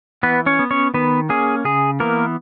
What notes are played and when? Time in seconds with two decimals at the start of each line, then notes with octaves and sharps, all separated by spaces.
0.23 E3 B3 B4
0.46 C#4 C#5
0.59 B3
0.71 C#4 C#5
0.94 D#3 B3 B4
1.29 A#3 C#4 G#4
1.65 C#3 G#4
2.00 E3 A#3 B3 A#4